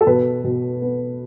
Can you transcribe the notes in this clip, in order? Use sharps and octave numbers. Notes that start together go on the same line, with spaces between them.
A4
B2 B4
B2
B3